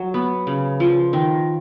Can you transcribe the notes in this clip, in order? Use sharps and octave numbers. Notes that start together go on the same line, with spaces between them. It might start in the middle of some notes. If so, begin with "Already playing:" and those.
Already playing: F#3
B3
C#3
F3
D#3